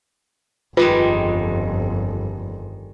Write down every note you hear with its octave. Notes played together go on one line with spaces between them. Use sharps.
G1 F2 D#3 G3 G#3 F4 B4